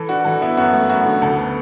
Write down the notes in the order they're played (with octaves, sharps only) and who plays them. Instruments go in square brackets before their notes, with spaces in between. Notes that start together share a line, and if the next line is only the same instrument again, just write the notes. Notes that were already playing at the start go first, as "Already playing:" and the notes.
Already playing: [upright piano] E3 [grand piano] A4
[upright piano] D4 [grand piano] F#4
[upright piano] E3 [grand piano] A4
[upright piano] B3 [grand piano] E4
[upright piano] F#2 [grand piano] F#4
[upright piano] A3
[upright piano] F#2 [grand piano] F#4
[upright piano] D3
[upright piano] D2 [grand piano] A4
[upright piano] B3